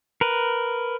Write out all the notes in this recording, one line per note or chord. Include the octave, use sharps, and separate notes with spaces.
A#4 B4